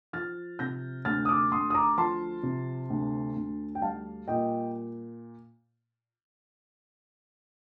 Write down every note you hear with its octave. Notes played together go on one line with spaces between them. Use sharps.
F3 F6 A6
C3 G6 A#6
D2 F6 A6
D#6
D6 F6
D2 C6 D#6
D#6
A#5 D6
F3 A5 C6
C3
D2
D2
G5
G3 F5 A5
A#2 D#5 G5